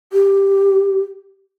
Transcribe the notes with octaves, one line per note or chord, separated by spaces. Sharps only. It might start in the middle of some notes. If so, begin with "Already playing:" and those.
G4